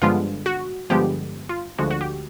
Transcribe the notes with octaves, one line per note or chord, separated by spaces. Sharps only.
G2 D3 F3 G#3 B3 F4
F#4
G2 D3 F3 G#3 B3 G4
F4
D2 D3 F3 G#3 F#4
F#4
G4